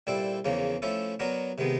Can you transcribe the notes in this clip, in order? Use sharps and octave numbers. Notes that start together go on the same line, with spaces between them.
A#2 G3 C4 E4 A4
E2 C#3 F3 A#3 C#4
F3 A3 C#4 E4 A4
F#3 B3 D4 F#4 A#4
C3 D#3 G#3 B3